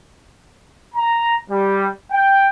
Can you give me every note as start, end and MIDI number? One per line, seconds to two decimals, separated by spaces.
0.95 1.37 82
1.50 1.88 55
2.12 2.49 79